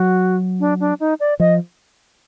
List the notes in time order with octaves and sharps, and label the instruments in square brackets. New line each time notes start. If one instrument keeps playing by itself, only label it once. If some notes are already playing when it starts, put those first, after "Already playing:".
Already playing: [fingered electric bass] F#3 [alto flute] F#4
[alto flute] D4
D4
D#4
D5
[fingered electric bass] F3 [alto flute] D#5